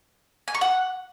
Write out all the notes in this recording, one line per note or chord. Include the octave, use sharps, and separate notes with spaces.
G#5
C#6
F#5